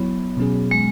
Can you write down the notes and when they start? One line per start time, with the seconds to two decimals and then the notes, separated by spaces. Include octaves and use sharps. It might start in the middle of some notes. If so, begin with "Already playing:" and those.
Already playing: F#3 B3 E4 C#5
0.37 B2 F#3 C#4 G#4
0.71 G#3